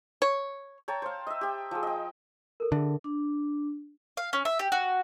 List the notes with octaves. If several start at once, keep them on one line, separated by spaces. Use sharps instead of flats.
C#5
C#5 G5 A5 A#5
C5 F5
D#5 E5
G4 G5
F3 G#4
D#5 G5
A4 A#4
D3 G#4 E5
D4
F5
C#4
E5
G4
F#4